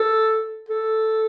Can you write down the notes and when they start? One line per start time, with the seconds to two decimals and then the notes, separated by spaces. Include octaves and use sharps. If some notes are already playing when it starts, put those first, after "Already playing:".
Already playing: A4
0.69 A4